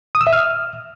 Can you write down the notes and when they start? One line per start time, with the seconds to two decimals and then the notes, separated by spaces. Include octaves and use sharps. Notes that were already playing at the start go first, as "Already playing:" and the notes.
0.15 D#6
0.21 E6
0.27 E5
0.33 F6